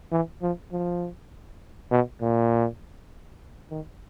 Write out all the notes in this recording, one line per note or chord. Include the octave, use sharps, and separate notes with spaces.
E3
F3
F3
B2
A#2
D#3